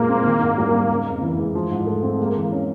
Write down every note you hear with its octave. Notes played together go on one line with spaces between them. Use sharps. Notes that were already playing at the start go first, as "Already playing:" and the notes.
Already playing: A#2 F3 G#3 A#3
C4
D#3
G#2
G3
C4
C#3
F2
E3
G#3
F3
G#2
A3
C4
G#3 A#3
E3
C#4